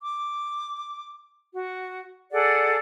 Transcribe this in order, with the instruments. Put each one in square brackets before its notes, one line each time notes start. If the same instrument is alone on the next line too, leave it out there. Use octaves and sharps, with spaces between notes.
[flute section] D6
F#4
G#4 A4 D5 F#5